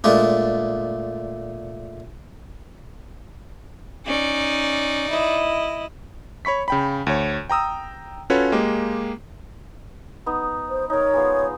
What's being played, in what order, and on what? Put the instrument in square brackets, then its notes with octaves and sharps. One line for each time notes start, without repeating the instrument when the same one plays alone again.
[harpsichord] A#2 G#3 A3 D4
[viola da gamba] C#4 [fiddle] D#4 D5
[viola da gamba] E4 D#5
[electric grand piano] C#5 B5 C#6 B6
C#3 G5 B5
D2 C#5
G5 A#5 D#6 E6
C#4 F4 F#4 A4 B4 C#5
G#3 A#3 G4
[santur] B3 D#4
[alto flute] C5
[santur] D#4 A#4 [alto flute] C#5
[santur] G#3 B3 F4